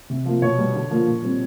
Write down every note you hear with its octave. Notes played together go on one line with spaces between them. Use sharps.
C3
F3 A#3
B2 C#5
G3 B3
D3
F3 A#3
A#2
G3 C4